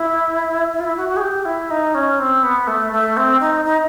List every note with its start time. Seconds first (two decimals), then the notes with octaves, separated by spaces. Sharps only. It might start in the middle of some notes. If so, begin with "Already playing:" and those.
Already playing: E4
0.73 E4
0.80 F4
0.84 E4
0.97 F#4
1.09 F#4
1.17 G#4
1.21 G4
1.45 E4
1.71 D#4
1.95 C#4
2.20 C4
2.43 B3
2.67 A3
2.92 A3
3.17 C4
3.40 D#4
3.65 D#4